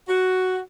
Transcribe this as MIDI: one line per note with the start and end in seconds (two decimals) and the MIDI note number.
0.08 0.59 66